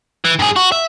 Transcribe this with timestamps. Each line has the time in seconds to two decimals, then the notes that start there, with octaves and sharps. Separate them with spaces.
0.25 E3
0.39 G2 G#4
0.56 F#4
0.72 E5